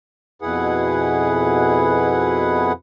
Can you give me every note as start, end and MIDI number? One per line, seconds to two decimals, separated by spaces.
0.42 2.72 41
0.42 2.72 47
0.42 2.72 64
0.42 2.72 68
0.42 2.72 71
0.42 2.72 78